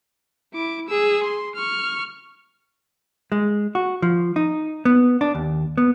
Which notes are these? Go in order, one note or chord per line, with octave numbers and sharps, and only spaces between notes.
E4 D6
G#4 E6
C6
C#6 F6
G#3
F#4
F3
D#4
B3
D4
D#2
B3